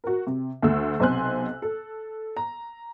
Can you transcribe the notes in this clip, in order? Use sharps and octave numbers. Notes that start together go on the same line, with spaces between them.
F#4 A#4
C3
D2 A3 E6
B1 C3 C5 G#5 C6 F#6
A4
A#5